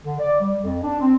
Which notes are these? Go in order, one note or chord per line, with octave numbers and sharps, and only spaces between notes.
D3
D5
G3
F2
D4
C4